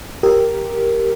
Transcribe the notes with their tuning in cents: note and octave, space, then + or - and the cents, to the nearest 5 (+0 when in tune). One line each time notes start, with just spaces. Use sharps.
G4 +0 A#4 +0